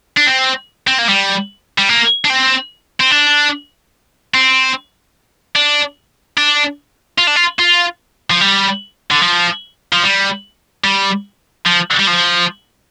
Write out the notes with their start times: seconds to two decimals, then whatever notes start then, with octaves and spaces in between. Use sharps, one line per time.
0.17 D4
0.27 C4
0.87 C4
0.99 A#3
1.09 G3
1.78 G3
1.89 A#3
2.25 D4
2.30 C4
3.01 C4
3.11 D4
4.34 C4
5.56 D4
6.37 D4
7.18 F4
7.27 D4
7.36 F4
7.59 F4
8.30 F3
8.41 G3
9.11 D3
9.22 F3
9.93 F3
10.03 G3
10.84 G3
11.66 F3
11.99 G3
12.07 F3